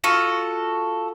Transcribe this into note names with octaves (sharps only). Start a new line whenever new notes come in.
F4 F#4 A4